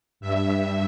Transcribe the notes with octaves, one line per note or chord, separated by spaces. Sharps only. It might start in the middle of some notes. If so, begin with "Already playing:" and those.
G2 E5